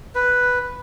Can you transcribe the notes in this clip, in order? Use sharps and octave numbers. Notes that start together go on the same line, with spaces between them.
B4